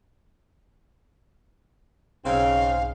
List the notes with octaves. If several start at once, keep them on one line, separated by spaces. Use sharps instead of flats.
B1 G#2 C#3 C4 C5 F5